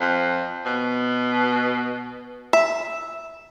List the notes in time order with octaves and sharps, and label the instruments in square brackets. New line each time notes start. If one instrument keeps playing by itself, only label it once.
[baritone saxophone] F2
B2
[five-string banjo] E5